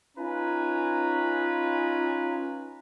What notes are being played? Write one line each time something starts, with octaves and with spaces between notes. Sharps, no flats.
C#4 D#4 F4 B4 G#5 A#5